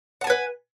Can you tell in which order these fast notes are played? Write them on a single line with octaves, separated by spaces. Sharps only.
F#5 A5 G#5 B4